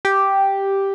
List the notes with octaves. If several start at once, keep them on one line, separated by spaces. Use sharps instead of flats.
G4